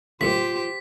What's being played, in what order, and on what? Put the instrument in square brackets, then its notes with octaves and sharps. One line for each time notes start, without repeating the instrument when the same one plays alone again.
[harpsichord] F#2 A2 C#3 [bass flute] F4 [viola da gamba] G4 C5 [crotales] B6